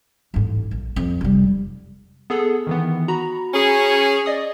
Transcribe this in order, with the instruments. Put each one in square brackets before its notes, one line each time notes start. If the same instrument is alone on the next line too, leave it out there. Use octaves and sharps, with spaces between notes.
[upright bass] A1 G#2
A#1
F2
F1 G3
[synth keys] B3 G#4 A4
D#3 E3 B3
F#4 A#5 B5
[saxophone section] C#4 G#4
[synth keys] D5 D#5 D#6